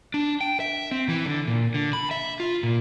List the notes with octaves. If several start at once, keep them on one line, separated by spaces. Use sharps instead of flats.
D4
G5
E5
C4
E3
D3
A#2
D3
B5
E5
F4
A#2